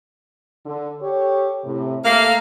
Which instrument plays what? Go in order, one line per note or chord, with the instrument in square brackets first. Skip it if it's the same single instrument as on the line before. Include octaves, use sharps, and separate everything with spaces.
[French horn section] D3
G4 A4 C#5
A2 C3
[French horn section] A3 [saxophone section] A#3 F5